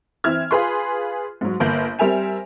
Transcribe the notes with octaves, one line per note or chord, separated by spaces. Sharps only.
E3 C4 E5 F6 G#6
F4 G#4 B4 C6
G#2 F#3
G1 A#3 G6 F#7
G3 C4 A#4 E5 G#5 F7